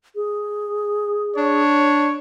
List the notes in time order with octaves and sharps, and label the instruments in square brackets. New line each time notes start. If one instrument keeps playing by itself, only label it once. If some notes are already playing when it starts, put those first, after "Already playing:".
[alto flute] G#4
[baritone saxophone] D4 [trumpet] C#5